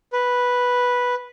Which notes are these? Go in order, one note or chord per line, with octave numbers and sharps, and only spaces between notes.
B4